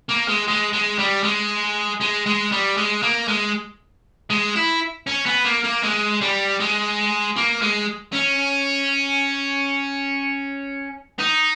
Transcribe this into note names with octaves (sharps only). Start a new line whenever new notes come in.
A#3
G#3
G#3
G#3
G3
G#3
G#3
G#3
G3
G#3
A#3
G#3
G#3
E4
C#4
B3
A#3
A#3
G#3
G3
G#3
A#3
G#3
C#4
D#4